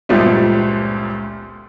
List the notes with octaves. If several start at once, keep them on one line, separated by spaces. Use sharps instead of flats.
G1 C#2 A#2 F3 G3 A3